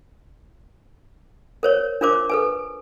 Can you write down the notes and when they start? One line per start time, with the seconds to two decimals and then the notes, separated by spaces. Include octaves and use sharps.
1.63 A#4 C5 C#5
2.01 D4 F4 A#4 C5 D6
2.30 A4 B4 G#5